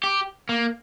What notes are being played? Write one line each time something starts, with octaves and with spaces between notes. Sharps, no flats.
G4
A#3